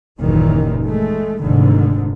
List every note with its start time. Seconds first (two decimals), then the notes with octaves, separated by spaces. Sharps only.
0.19 F#1 D#2 A#2 D#3 E3
0.84 G#3 A3
1.41 F1 G#2 D3 D#3